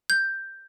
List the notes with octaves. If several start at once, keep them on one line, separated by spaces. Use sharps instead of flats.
G6